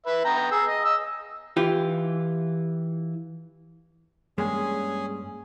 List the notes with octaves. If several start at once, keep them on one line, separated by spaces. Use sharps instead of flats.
B4 E5
B3 G5 A#5
G#4 E6
D#5
D#5 E6
E3 F4 G4
G2 G#3 A#3 C#4 G#4